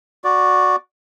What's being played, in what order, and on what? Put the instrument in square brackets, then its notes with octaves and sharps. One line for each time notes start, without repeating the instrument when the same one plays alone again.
[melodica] F#4 D5